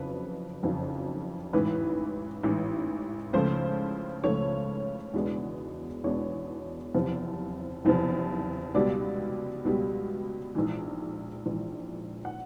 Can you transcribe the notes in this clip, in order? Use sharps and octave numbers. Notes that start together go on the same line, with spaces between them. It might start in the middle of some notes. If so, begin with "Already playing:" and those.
Already playing: F#1 F2 C#3 F#3 B4
F#1 F2 C#3 F#3
A1 G#2 E3 B4
A1 G#2 E3
C#2 C#3 F3 A3 C5
C#2 C#3 F3 A3 C#5
E2 B2 G#3 B3 D4
E2 B2 G#3 B3 D4 C#5
F#1 E2 C3 F3
F#1 E2 C3 F3
C#2 B2 G3 D5
C#2 B2 G3
A#1 G#2 E3
A#1 G#2 E3
F#5